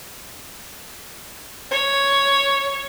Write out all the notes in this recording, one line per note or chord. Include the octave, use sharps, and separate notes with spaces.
C#5